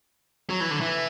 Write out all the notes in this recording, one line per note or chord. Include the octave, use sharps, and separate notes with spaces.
F#3
E3
D3
E3